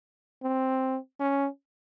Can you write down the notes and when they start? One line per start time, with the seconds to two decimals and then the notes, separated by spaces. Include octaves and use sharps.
0.43 C4
1.20 C#4